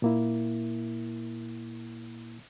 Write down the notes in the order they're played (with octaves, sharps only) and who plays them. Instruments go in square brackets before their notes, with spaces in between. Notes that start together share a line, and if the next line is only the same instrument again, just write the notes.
[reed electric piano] A#2 A#3 E4